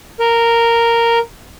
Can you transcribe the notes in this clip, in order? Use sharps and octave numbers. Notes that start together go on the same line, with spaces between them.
A#4